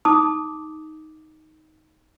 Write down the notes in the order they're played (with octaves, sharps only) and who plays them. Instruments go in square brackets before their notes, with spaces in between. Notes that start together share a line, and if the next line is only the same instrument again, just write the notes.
[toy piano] D#4 A5 D6 D#6